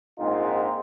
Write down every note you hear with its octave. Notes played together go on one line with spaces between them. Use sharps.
A#1 G#2 G#3 C4 D#4 F4